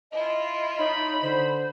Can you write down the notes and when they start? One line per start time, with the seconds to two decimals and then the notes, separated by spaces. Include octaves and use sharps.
0.12 E4 F4 D#5
0.79 D#4 C#5 B5
1.22 D3 C5